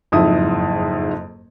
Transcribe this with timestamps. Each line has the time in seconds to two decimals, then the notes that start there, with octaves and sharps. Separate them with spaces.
0.12 F#1 F2 G#2 E4 D#6